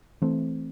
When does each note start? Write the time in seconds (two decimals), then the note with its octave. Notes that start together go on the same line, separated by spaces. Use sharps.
0.22 E3 A3 C4